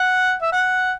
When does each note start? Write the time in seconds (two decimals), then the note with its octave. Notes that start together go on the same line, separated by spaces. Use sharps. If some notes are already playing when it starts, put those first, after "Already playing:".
Already playing: F#5
0.42 E5
0.52 F#5